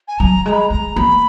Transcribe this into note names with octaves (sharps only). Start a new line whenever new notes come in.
G#5
F#3 A#5
G#3 A#5
B5
A#5
G#3 A#5
A#3 B5